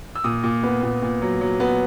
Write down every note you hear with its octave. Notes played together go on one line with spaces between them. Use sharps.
E6
A#2 D#6
A#2
B3
A#2
A#2
F#3
F#3
B3